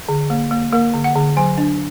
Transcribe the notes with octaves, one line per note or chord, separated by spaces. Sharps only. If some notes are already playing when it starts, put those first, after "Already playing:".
D3
A#3
A#3
A#3 A#4
D3
F#5
D3
F#3 G#5
D4